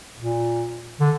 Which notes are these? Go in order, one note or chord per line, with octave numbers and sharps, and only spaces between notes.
A#2
D3